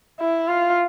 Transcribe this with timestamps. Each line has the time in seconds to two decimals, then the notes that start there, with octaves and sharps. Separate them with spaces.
0.21 E4
0.48 F4